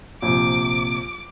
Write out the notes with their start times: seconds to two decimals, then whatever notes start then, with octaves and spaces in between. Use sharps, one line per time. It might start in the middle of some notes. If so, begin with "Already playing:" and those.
0.22 A#1 C3 D6